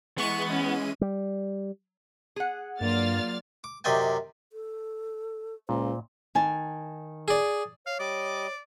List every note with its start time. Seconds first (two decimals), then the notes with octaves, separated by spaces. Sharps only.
0.18 E3 G#3 B3 C#6 D#7
0.50 C#4
1.01 G3
2.36 G#4 F#5
2.81 G2 F#3 A#3 F4 D5 F6 A6
3.64 D6
3.84 F#2 C3 D5 D#5 G5 G#5
4.53 A4
5.69 C#2 A#2 C5
6.35 D#3 G#5 A5
7.28 G#4 D5
7.86 C#5 F5
7.99 G3 D5 D#5 D6